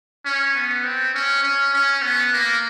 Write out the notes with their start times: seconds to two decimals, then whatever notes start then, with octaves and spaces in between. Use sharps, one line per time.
0.25 C#4
0.55 B3
0.84 C4
1.14 C#4
1.43 C#4
1.73 C#4
2.02 B3
2.33 A#3